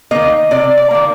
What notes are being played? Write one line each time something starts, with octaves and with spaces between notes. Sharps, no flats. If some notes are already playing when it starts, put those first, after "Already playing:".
D#3 A#3 D#5
C3 D5
D5
D#3 A#3